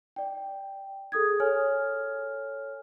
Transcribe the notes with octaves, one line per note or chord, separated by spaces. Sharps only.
D5 G5
G#4 A4 D#6 G#6
A4 C#5 G#5 F6